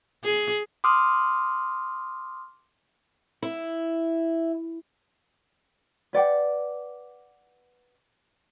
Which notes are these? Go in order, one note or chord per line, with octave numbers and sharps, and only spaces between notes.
G#4
C6 D6 D#6 F6
E4
B4 D5 F#5 G5